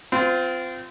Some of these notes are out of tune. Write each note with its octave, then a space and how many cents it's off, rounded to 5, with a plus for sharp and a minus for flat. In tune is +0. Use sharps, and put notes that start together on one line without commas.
C4 -25 F4 +0